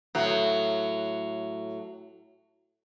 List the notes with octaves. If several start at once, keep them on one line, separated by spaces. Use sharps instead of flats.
A2 F#3